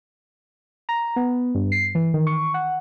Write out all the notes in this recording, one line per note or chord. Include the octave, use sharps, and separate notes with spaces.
A#5
B3
G2
C7
E3
D#3
C#6
F#5